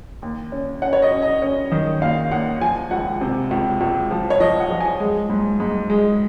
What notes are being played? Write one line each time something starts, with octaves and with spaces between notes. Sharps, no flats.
D#2
C#4
C#4 F#5
C#5
D#5
C#4
D#5
C#4
D#3
D#2 F5
D#2 F#5
F3 G#5
C#2 F#5
C3
C#2
C#2
F3
C#5
F3 D#5
F#5
F3
G#5
G#3
G#2
G#2
G#3